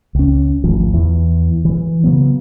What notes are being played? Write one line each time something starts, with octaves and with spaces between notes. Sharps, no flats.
C#2 C#4
G#1 D2 F3
E2 E3
E3
C#3 F#3 B3